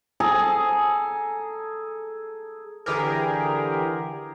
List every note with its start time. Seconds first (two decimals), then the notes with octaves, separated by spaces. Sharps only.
0.20 G#4 A4 A5 A#5
2.86 D3 E3 G4 G#4 A#4